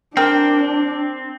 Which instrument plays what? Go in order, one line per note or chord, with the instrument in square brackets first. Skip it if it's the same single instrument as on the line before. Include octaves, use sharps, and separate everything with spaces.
[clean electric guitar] C4 [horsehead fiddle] D4 [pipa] G#4 A#4 G5